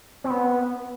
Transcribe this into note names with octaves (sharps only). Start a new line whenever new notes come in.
C4
B3